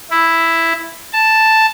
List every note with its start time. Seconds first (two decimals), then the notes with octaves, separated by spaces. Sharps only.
0.10 E4
1.13 A5